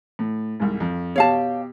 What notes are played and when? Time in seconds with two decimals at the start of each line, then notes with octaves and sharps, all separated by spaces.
0.19 A2
0.60 C2 G#2
0.80 F2
1.16 B2 G4 C#5 F5 A5